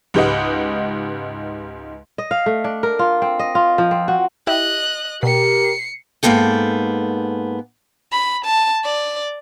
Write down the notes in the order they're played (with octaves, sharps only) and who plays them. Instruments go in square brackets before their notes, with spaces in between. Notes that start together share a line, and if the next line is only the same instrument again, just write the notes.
[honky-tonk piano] C#2 G#2 G4 B4 D#5 F#5
[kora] D#5
F5
A3
D4
A#4
F4
C4
D#5
F4
F3
C4
F#4
[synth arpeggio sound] E4 G4 E5 [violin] D#5 F#6
[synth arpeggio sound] B2 [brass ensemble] G4 A#4 [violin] C7 C#7
[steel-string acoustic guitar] G#2 E3 A#3 B3 A4 G5
[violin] B5
A5
D5